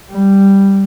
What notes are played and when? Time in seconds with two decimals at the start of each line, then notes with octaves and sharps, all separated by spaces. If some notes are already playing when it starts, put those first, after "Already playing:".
0.11 G3